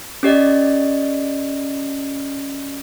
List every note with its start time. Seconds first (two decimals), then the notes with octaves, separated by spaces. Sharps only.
0.23 C#4 G4 D5 D#5